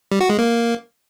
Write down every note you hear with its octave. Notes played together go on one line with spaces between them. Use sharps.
G3
F#4
G#3
A#3